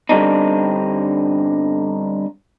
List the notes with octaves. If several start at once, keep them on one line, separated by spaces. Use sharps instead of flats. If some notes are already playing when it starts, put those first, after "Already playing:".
G2 D3 G3 C4 D4 D#4